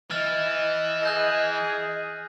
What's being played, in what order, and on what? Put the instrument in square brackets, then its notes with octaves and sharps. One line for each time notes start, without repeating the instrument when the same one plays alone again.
[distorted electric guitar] E3 [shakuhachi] D#5 [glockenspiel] F6 A6
[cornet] G#4 [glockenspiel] F#6 G6 A#6